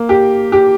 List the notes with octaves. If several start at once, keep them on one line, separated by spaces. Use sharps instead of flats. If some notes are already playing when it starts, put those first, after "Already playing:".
Already playing: A#3
G4
G4